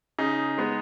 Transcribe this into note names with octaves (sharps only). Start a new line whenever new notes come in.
C#3 D#4
G#3 B3